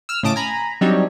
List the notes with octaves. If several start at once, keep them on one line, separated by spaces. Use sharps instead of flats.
E6 F6
A2 C#3 D#5 A5 D6 D7
G#5 A#5 B5
F#3 G3 C4 D4 D#4 C#5